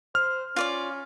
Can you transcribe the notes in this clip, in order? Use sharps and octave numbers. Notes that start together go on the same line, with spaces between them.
C5 F6
C#4 F4 D5 D6